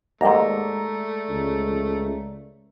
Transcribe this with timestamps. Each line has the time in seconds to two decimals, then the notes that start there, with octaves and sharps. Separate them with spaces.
0.21 D#2 G#2 G#3 A3 D5 A#5
1.30 C#2